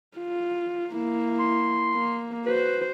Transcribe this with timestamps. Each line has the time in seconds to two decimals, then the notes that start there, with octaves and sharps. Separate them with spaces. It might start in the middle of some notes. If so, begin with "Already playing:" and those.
0.17 F4
0.93 A#3 E4
1.39 C6
1.95 A#3
2.46 F#4 B4 C5